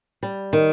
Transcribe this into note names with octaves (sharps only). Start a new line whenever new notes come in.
G3
D#3